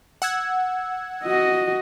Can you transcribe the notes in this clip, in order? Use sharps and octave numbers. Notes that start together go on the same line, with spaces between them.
F#5 E6 G#6
F#4 D#5